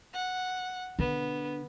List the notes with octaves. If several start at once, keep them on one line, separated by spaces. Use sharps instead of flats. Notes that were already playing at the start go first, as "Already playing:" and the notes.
F#5
D3 B3